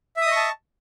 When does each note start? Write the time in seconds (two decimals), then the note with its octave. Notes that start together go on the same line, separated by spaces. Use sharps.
0.17 E5
0.22 D#6
0.27 D#5
0.31 C#6
0.36 A5